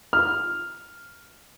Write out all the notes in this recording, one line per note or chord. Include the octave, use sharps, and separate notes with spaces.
F6